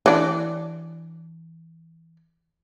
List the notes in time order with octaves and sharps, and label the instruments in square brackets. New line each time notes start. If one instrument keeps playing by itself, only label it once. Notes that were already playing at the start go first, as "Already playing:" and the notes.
[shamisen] E3 D4